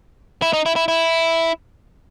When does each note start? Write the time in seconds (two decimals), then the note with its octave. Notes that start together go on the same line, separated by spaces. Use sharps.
0.42 E4
0.53 D#4
0.66 E4
0.76 E4
0.88 E4